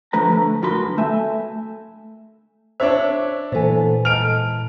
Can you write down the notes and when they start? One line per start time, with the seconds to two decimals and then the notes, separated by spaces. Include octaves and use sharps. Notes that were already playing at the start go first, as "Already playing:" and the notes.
0.13 D3 F3 A3 B4 A#5
0.32 A3
0.63 F#2 D3 F#4 A#4 B4 C6
0.98 A3 E5 G#5
2.80 D4 C5 C#5 E5
3.52 A#2 E3 B3 A4 C5 G#5
4.05 G#2 A5 F6 D7 F7